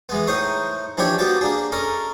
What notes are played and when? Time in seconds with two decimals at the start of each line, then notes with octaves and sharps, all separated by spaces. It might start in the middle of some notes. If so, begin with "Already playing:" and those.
0.09 E3 G#3 B3
0.27 A2 D#4 C5 C#6 D#6
0.97 E3 F3 D4 E4 G4 C#5
1.18 A#3 B3 F#4 G4 A5
1.41 A#3 D4 G#4
1.72 C#4 A4 A#4 D#5